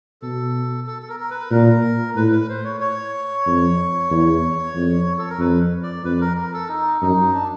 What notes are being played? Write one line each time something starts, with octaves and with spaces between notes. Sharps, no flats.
B2 A4
A4
A4
A#4
A#4
B4
A#2 A#4
A2 B4
B4
C5
C#5
C#5
F2
E2
F2
A4
A#4
F2 B4
D5
F2 B4
A#4
A#4
A4
D#4
F#2 D#4
D4